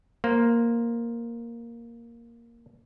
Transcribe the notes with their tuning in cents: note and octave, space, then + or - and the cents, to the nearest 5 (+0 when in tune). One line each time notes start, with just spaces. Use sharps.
A#3 +0 C5 +0